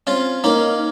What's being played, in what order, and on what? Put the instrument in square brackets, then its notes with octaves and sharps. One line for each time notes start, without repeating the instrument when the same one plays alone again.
[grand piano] C4 [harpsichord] C#4 F4
[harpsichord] A#3 C#4 [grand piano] D#4 A#4 D#5